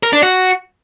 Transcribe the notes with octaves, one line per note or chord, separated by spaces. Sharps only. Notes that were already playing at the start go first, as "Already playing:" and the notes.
A#4
D4
F#4